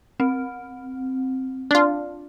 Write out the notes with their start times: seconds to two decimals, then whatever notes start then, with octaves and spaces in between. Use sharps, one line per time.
0.20 C4
1.71 D4 F4